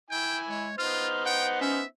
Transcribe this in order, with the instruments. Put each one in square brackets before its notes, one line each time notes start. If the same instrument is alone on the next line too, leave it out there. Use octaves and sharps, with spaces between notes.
[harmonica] E4 G#5 [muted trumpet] G5
[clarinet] G#3 [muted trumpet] C#5
[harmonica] B3 D#4 C5 [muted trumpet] F4 [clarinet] F6
[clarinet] F#5 [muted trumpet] G5
[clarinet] C#4 [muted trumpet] E5